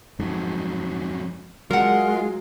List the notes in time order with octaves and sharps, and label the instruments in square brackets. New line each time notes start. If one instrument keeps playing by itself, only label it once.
[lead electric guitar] F2 F#3 [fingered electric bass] G#2
[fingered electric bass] F#3 [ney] G#3 [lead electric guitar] F4 [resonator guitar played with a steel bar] A#4 F#5